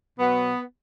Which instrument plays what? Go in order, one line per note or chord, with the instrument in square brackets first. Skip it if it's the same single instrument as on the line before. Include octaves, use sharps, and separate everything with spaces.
[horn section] B2 F#3 B3